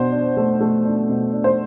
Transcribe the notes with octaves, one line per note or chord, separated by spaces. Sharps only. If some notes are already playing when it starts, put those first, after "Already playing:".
Already playing: B2 D4 C5
D4
A3
A3
D4
B2
D4
C5